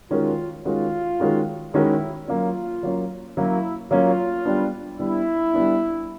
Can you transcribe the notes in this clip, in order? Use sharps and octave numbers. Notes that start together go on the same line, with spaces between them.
D#3 G#3 C#4 F4 F#4 A#4
D#3 G#3 C#4 F4 F#4 A#4
D#3 G#3 C#4 F#4 A#4
D#3 G#3 C#4 E4 F#4 A#4
F#3 A#3 C#4 F4
F#3 A#3 C#4
F#3 A#3 C#4 E4
F#3 A#3 C#4 F4
G3 B3 D4
G3 B3 D4 E4
G3 B3 D4